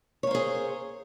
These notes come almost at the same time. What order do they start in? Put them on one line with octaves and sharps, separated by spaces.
C#5 A#3 C5 G#4